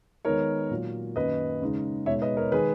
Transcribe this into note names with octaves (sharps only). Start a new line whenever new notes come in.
D#3 G#3 B3 D#4 A#4 C#5
A#2 F#3 A#3
F#2 D#3 A#3 B4 D#5
C#3 G#3 D#4
B2 G#3 D#4 C#5 E5
B4 D#5
A#4 C#5
D#3 G#3 D#4 G#4 B4